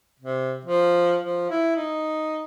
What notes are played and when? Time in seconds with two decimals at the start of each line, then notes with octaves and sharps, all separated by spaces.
0.19 C3
0.65 F3
1.22 F3
1.50 E4
1.76 D#4